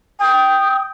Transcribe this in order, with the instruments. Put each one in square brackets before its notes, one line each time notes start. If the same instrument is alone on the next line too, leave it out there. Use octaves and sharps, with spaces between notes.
[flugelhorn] G5 [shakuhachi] D#6